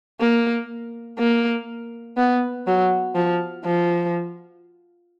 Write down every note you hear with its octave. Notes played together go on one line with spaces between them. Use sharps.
A#3
A#3
B3
F#3
F3
F3